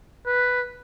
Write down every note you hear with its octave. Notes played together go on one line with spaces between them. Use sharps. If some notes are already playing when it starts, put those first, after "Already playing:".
B4